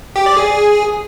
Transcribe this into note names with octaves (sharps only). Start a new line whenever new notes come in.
G4
D5
G#4